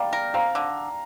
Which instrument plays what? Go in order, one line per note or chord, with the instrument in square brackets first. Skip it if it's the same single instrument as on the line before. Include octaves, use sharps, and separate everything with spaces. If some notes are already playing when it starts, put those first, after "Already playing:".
Already playing: [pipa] G3 [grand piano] D5 F5 G5 A#5
[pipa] A#4
[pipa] C4 [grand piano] F5 A#5
[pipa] D3